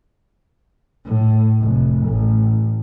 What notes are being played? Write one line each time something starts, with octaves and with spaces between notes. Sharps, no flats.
A2
F1
A1